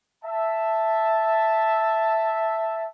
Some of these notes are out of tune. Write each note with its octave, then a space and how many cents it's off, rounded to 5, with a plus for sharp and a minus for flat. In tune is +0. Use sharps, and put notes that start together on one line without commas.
E5 +0 A5 +0